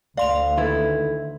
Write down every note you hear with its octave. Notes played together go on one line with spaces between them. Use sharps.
D2 D5 F5 C6 F7
D#3 E4 A4 B4